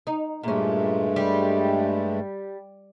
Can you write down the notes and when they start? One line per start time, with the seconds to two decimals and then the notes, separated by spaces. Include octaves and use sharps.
0.07 D#4
0.44 G2 A#2 G#3 A3 C#4
1.16 G3